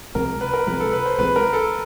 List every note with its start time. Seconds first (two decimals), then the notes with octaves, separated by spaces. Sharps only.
0.15 C2 C3 F3 G#3 A#4
0.41 B4
0.53 A#4
0.67 C2 C3 F3 G#3 B4
0.80 A4
0.93 B4
1.06 C5
1.18 C2 C3 F3 G#3 B4
1.36 A#4
1.53 A4